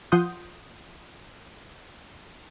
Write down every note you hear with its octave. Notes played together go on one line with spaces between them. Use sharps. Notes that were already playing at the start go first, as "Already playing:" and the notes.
F3 F4 F#5 C6 D#6 G6